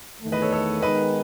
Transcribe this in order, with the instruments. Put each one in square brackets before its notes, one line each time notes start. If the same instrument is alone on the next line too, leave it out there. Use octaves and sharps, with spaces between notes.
[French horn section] E2 D#3 A3
[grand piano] B4 D#5
A4 C#5
A4 C#5
[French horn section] D#3 G#3 B3 D#4 [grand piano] B4 D#5